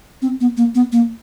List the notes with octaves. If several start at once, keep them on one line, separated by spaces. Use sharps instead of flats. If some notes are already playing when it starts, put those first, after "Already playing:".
C4
B3
A#3
B3
A#3